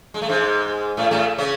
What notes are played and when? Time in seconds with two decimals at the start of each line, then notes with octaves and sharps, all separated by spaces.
0.14 G#3
0.22 A3
0.29 G#2 G#3
0.97 A2 A3
1.11 A2 A3
1.38 C#3 C#4